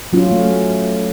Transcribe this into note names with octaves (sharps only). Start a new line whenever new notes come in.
F#3 C#4 F4
A3